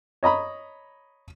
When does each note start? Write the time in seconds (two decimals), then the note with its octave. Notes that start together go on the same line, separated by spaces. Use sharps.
0.23 C#5 D#5 A#5 B5